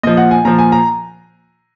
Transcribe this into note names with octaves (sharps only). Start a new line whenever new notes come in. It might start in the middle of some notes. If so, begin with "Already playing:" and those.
A#2 F3 D#5
F#5
G#5
A#2 F3 A#5
G#5
A#5